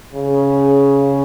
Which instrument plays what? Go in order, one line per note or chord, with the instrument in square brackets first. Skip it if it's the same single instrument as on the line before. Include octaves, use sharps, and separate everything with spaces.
[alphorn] C#3